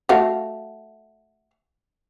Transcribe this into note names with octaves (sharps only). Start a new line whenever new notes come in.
A3 F#4 F5